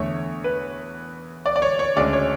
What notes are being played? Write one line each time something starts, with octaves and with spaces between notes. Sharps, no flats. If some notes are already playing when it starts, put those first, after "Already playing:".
Already playing: E2 D3 A3 C#5
B4
D5
D5
C#5
C#5
D2 C#3 G#3 D5
C#5